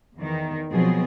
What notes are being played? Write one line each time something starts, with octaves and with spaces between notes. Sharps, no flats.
E2 D#3
B2 F3 F#3 C4 G#4